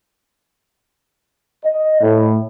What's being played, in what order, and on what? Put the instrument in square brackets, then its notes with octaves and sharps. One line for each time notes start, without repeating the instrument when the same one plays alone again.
[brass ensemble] D#5
A2